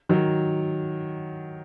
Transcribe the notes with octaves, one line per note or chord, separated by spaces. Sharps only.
D#3 F#3